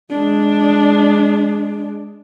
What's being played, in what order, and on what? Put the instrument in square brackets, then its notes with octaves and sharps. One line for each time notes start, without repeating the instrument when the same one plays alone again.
[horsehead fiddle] G#3 D4